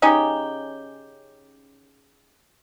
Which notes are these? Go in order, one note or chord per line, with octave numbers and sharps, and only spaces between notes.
C#3 C#4 D#4 G4